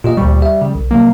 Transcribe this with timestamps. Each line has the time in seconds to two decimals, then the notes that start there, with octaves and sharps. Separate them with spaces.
0.04 A#2 F4 G4 D#5
0.17 D2 A#2 G3 C#6
0.42 G4 E5
0.62 C#3
0.75 B1
0.91 C3 F#3 G3 A#3